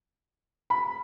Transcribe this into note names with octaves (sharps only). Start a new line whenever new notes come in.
B5